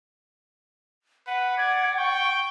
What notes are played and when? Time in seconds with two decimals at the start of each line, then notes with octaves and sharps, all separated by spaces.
1.27 B4 F#5
1.58 D5 G#6
1.97 G5 C#6